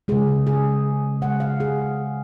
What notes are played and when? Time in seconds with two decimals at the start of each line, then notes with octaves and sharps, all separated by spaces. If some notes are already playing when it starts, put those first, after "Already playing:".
0.08 C#3 G#3 G#4
0.47 G#4
1.22 C#3 G#3 F#5
1.40 F5
1.60 G#4